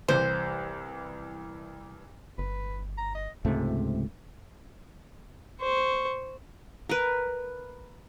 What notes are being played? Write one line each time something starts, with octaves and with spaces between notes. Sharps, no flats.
C2 E3 C5
G1 B4
A#5
D#5
C#2 G#2 C3 A3
C5 C#6
A#4 B4